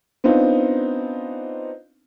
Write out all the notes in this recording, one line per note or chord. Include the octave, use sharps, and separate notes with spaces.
B3 C4 D4 D#4 F4